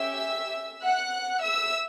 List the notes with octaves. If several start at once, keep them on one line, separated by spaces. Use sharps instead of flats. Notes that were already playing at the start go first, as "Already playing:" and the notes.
Already playing: C#4 G4 E5 E6
F#5 F#6
E5 E6